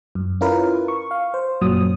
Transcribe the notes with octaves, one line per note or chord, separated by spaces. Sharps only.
F#2
C#4 E4 F4 A#4 B4
C#6
F5
C5
F#2 A#2 F#3 D#6